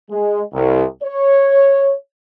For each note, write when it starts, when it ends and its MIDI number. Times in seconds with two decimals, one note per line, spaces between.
0.11 0.42 56
0.53 0.84 36
1.04 1.94 73